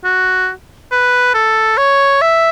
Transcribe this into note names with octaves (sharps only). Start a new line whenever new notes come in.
F#4
B4
A4
C#5
E5